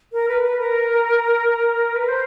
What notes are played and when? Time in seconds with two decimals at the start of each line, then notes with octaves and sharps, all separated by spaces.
0.13 A#4
0.29 B4
0.43 B4
0.59 A#4
1.96 B4
2.08 C5